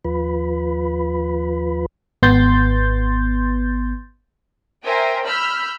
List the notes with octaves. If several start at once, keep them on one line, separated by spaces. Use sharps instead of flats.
D#2 F3 F4 B4 B5
G#1 B3 C6 G6 A6
A#4 C5 E5 G5 G#5
B5 E6 F6 G6 B6